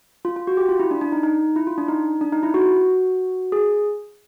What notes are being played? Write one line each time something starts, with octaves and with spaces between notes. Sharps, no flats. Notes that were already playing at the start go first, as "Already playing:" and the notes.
F4
F4
F#4
G4
F4
E4
D4
D4
D#4
D#4
E4
F4
D4
D#4
D4
D#4
E4
F#4
G#4